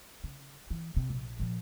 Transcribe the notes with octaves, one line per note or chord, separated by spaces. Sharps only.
C#3
E3
C3
A#1
A#2 F3